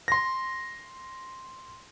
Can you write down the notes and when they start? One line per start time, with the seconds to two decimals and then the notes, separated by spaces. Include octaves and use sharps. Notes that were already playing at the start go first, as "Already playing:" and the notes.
0.08 C6 A#6